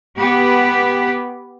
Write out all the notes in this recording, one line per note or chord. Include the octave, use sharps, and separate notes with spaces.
B3 G4